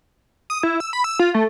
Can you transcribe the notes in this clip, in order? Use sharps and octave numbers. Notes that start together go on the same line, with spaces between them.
D#6
E4
E6
B5
E6
F4
A3